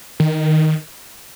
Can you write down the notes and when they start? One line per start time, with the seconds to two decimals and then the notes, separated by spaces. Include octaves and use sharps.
0.20 D#3